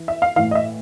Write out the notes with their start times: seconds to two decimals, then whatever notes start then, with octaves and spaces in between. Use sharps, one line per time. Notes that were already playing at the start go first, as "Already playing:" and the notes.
Already playing: E3
0.08 E5
0.22 F5
0.36 E3 F5
0.39 A2
0.51 D#5
0.55 E5